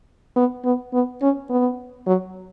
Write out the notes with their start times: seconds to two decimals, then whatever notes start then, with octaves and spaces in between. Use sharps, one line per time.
0.36 B3
0.65 B3
0.93 B3
1.22 C#4
1.50 B3
2.07 F#3